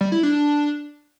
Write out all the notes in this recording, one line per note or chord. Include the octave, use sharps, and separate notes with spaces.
G3
E4
D4